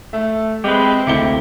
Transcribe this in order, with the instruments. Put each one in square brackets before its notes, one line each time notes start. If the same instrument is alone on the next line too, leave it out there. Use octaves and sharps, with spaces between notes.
[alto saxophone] A3 [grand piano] E5
[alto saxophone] G#3 [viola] C4 [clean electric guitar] G4 B4
[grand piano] D2 C#7 G7 [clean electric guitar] A#3 G4 [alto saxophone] E4